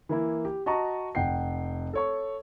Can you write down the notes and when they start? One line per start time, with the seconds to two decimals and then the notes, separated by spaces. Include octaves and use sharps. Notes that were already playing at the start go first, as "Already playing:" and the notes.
0.09 E3 A#3 E4
0.45 G4
0.66 F#4 D#5 A5 A#5 C#6
1.15 F1 F#5 G5 C7
1.93 A4 C#5 C#6